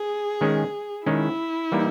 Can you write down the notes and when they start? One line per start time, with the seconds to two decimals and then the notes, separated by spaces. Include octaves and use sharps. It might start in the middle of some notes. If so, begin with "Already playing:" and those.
Already playing: G#4
0.41 D#3 G#3 C#4
1.06 D#3 G#3 C#4 E4
1.72 E3 G3 A#3 D#4